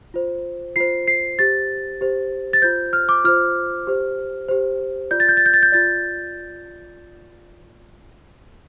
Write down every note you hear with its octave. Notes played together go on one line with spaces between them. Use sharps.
F4 C5
F4 C5 C7
C7
G4 C5 A6
G4 C5
A6
F4 C5 G6
F6
D6
F4 C5 F6
G4 C5
G4 C5
F4 D5 G6
A6
G6
A6
G6
A6
G6
F4 D5 A6